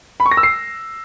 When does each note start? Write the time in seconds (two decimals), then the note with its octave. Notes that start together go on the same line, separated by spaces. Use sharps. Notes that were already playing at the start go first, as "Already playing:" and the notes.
0.20 B5
0.26 C#6
0.31 A#6
0.37 E6
0.43 C7